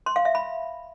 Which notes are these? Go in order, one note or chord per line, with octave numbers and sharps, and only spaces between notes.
C6
F5
E5
B5